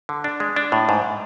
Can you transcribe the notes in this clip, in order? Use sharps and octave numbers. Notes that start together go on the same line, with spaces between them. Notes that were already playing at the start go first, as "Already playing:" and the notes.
D3
D4
G#3
D4
A2
G#2